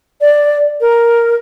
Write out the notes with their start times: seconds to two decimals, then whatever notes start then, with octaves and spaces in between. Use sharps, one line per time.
0.21 D5
0.81 A#4